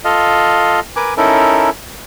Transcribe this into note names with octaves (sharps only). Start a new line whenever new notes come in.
F4 A4 D#5 F5
A#4 B4 G#5 D6
C#4 D#4 E4 A4 A#4